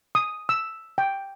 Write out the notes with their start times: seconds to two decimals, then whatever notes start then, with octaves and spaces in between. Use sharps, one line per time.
0.15 D#6
0.49 E6
0.98 G5